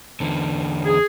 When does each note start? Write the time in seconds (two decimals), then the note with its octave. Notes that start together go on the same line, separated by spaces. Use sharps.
0.20 E2 D3
0.85 G#4